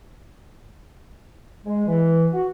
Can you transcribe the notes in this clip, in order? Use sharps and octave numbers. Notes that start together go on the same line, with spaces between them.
G#3
E3
F#4